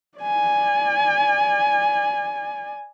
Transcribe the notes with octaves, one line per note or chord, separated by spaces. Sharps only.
D5 G#5